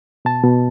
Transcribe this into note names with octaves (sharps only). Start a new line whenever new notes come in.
B2 A5
B2